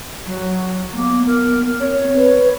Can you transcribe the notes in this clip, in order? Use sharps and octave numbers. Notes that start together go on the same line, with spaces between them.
F#3
A#3 B3
A#4
C4 C#5
B4